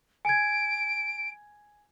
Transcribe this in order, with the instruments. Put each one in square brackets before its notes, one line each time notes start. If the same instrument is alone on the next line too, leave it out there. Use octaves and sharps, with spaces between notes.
[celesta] G#5 G#6 [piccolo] D7